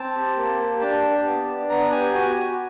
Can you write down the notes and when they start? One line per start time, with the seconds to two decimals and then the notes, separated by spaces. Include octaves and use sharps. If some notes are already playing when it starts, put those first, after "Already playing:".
Already playing: C4 A5
0.15 G4
0.36 A#3
0.59 G4
0.81 D4 A5
1.03 G4
1.24 B3
1.47 D4
1.70 B3 A#5
1.91 G4 G#5
2.13 F#4 G#5
2.36 F#4